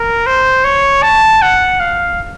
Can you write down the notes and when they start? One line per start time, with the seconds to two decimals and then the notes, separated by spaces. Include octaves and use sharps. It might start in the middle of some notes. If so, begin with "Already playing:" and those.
Already playing: A#4
0.26 C5
0.64 C#5
1.03 A5
1.42 F#5
1.80 F5